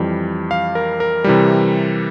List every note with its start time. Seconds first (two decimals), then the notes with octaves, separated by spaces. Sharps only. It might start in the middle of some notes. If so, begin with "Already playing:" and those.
Already playing: F2 E3 G3
0.51 F5
0.75 A#4
1.00 A#4
1.24 C3 E3 G3